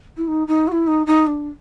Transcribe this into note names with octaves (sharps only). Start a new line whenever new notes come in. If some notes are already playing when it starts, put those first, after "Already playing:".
E4
D#4
D#4
F#4
E4
D#4
D#4
D4